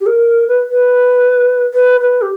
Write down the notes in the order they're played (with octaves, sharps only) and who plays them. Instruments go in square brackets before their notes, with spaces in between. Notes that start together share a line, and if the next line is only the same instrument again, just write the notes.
[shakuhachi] G4
A#4
B4
B4
B4
B4
G4